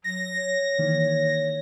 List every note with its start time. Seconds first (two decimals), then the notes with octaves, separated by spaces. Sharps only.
0.04 F#3 A#6
0.34 C#5
0.79 D#3 E3 A#3